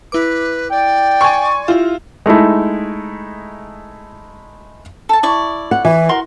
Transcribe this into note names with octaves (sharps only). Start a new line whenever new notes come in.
E4 B4 D6
D5 G5
G#5 C6 C#6
E4 F4 G4 E5
G#3 A3 D#4 E4
A4 A5
E4 D5 C#6
F#5
E3
F#4 A#4 C6